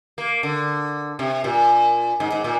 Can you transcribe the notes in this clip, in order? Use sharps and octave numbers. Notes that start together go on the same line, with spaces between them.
A#3
D3
C3
A#2
G#2
G#2
A#2